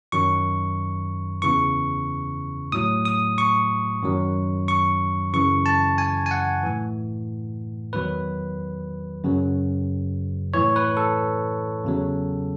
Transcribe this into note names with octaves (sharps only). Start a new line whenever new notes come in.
F#2 D#3 F#3 C#6
E2 C#3 E3 C#6
A2 F#3 D#6
D#6
C#6
F#2 D#3 F#3
C#6
F#2 C#3 E3 C#6
A5
G#5
G#5
F#5
A2 E3
E2 D#3 F#3 B4
F#2 C#3 F#3
A2 E3 C#5
B4
A4
E2 C#3 F#3